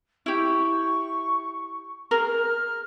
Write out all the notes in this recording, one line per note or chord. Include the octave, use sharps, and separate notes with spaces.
E4 G4 C#6
G#4 A#4 F6